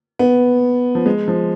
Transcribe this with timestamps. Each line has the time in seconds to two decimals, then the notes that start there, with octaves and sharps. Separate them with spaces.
0.19 B3
0.95 F3
1.06 G#3
1.28 F3